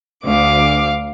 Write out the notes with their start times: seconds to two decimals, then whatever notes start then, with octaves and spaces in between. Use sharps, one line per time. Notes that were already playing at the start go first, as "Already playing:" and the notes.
0.24 D2 F5 D6